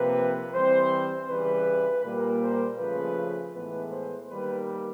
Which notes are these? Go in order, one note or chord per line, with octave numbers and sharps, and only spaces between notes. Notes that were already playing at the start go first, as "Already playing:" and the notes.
Already playing: C3 F3 A#3 B4
E3 G3 C4 C5
C#3 E3 G3 B4
A#2 G3 A#3
C5
C#3 F3 A3 B4
A2 E3 G#3 B3 B4
C5
D#3 G3 A#3 B4